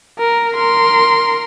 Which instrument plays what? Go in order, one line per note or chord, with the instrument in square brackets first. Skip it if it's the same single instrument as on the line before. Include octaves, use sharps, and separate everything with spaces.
[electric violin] A#4
A#4 C6